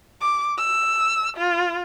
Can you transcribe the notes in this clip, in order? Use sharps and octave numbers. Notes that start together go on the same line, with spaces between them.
D6
E6
F4